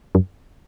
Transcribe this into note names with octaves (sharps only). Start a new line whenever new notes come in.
F#2